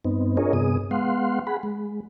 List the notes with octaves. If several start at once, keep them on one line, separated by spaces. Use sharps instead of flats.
G2 B3 C4 D#4
D4 F4 G#4 A#4 C#5 D#5
G2 C3 B3 G#4 D#6
G#3 B3 F5 F#5 C6
G#4 F#5 B5
G#3